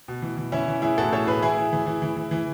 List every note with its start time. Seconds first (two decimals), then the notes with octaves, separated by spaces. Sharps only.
0.08 B2
0.22 E3
0.37 E3
0.52 E3 C#4 E4
0.68 E3
0.82 E3 E4 G#4
0.98 A2 F#4 A4
1.12 A2 A4 C#5
1.27 A2 G#4 B4
1.42 E3 E4 G#4
1.57 E3
1.73 E3
1.86 E3
2.02 E3
2.16 E3
2.31 E3